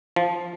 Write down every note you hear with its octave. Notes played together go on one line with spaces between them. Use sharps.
F3